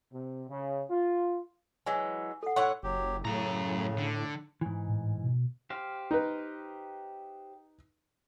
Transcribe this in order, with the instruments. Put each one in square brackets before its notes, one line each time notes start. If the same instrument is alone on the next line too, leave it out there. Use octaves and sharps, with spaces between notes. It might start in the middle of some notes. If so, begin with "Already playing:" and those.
[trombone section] C3
C#3
F4
[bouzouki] E3 F#3 G#3 [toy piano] G#5
[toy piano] A4 F#5
[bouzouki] A2 C#5 F#5 [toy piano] C6
[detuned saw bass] F#1 [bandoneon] F#3 G4
[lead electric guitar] F#2 A#5 [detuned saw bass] A2 [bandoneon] C#3
[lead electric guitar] D3
[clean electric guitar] G#2 E3
[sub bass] A2
B2
[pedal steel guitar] G4 C5 F5
[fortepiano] D#4 B4